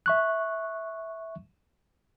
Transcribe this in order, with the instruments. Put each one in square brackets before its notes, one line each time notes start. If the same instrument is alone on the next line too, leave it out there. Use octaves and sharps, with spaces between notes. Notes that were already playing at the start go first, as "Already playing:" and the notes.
[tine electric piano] E5 C#6 F#6